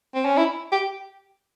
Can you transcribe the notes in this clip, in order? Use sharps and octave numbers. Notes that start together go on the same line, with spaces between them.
C4
C#4
E4
G4